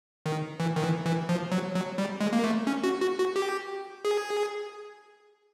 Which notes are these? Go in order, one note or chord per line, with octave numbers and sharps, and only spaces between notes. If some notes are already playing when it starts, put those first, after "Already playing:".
D#3
E3
D#3
E3
E3
F3
F#3
F#3
G3
G#3
A#3
A3
C#4
F#4
F#4
F#4
G4
G#4